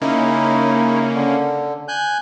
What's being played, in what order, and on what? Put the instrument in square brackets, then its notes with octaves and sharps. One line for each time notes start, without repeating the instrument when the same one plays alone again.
[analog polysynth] C#3 A#3 C#4 [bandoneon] D#4 E4
[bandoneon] D3
G#5 F#6 G6